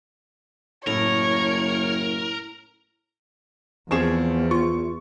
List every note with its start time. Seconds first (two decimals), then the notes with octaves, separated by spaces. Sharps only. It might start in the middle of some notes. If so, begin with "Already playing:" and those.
0.87 F#1 A2 A#4 C#5
3.91 E2 F3 C4 G#4 C#6 E7
4.51 F4 C#6